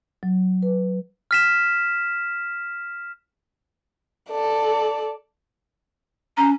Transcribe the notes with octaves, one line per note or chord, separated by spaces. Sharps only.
F#3
B4
F6 B6 E7
A4 D5
C#4 A#5